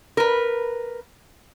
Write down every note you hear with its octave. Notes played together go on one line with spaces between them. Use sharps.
A#4 B4